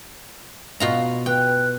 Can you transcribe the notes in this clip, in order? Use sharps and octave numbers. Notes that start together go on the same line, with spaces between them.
B2 F4 A#5
B4 G5